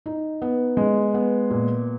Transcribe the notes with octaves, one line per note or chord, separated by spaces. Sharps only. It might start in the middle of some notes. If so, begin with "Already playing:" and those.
D#4
B3
G#3
B3
A#2